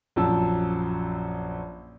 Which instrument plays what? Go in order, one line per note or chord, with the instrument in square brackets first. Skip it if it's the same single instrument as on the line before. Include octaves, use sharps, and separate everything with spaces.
[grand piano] A#1 F#2 F3 A5 E6